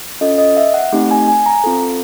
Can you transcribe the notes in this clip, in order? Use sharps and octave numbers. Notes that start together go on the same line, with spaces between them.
C#4 F4 A4 D#5
D#5
E5
F#5
A3 C4 D#4 G4
G#5
G#5
A#5
C4 F4 A4